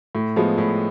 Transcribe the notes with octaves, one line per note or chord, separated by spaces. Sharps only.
A2
F3 G#3 B3
A2